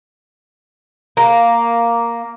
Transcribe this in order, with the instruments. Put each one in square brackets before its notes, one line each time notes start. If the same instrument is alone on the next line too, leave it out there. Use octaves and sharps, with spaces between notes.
[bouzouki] A#3